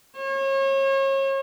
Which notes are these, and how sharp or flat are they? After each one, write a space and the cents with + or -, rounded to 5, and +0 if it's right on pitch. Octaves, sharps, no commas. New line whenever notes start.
C#5 -35